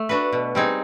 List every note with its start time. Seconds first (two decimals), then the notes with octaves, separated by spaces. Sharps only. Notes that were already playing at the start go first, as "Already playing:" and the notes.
Already playing: A3
0.09 D4 F#4 B4
0.32 B2
0.55 G3 C4 D#4 G#4